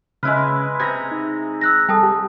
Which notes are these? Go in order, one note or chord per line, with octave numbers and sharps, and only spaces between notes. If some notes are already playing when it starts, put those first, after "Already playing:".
C#3 G#3 C#4 E4 B4 F6
C3 G#4 A#5 G#6
D#4
E6 F#6 A#6
G3 A4 G5 A5 D#6
G4